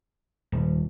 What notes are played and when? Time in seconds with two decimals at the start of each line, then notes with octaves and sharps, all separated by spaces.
0.52 D#1